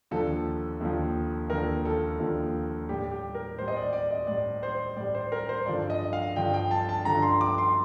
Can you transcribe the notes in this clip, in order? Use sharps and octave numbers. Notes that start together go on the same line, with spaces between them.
D#2 D3 F3 A4
D#2 D3 F3
D#2 D3 F3 A#4
A4
D#2 D3 F3
A2 G3 G4
G4
A#4
A2 G3 C5
D#5
D5
D5
D#5
A2 G3 D5
C5
A2 G3 D5
C5
A#4
C5
G2 D3 F3 D5
D#5
F5
G2 D3 F3 G5
G5
A5
A5
G2 D3 F3 A#5
C6
D6
C6